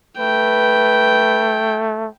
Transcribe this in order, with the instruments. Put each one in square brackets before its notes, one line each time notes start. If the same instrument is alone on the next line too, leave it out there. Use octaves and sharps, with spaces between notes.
[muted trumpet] A3 [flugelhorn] B4 [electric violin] G5